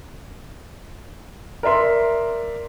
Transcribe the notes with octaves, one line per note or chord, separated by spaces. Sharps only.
A#4 D5 E5 C6